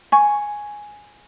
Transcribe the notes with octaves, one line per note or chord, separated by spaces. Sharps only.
G#5 C#6